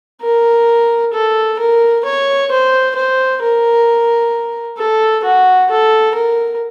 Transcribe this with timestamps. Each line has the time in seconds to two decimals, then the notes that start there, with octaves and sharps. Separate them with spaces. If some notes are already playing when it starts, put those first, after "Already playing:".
0.22 A#4
1.14 A4
1.59 A#4
2.05 C#5
2.51 C5
2.96 C5
3.42 A#4
4.78 A4
5.24 F#4
5.70 A4
6.15 A#4